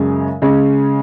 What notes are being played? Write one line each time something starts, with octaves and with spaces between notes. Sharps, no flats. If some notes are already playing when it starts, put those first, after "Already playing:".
Already playing: F#2 C#3 G#3 C#4
C#3 G#3 C#4